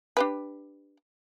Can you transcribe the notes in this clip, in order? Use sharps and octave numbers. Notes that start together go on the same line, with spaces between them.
D4 G4 B4